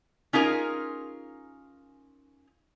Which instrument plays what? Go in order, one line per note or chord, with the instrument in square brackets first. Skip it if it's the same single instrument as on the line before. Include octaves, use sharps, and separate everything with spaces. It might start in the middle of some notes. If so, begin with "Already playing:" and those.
[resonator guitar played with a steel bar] C#4 D#4 F4 G#4 A#4